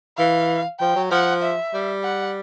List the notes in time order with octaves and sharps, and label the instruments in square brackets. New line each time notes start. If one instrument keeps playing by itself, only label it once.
[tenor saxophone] E3 [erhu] F5
[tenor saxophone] F3 [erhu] G5
[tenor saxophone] F#3
[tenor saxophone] F3 [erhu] F#5
[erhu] E5
[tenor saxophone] G3
[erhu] F#5